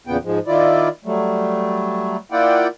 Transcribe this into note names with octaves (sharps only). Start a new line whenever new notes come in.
E2 A#2 C#3 B3 G5
G#2 F3 G#3
D#3 E4 F4 D5
F#3 G3 A3
A#3 E4 F4 D5 F#5 G5